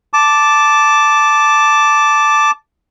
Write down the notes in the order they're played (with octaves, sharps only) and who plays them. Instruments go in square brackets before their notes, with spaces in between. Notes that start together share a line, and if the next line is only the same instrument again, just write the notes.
[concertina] A5 D6